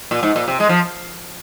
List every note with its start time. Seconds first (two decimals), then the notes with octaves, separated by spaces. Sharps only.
0.11 A#2
0.23 G#2
0.36 A#2
0.48 C3
0.60 G#3
0.69 F3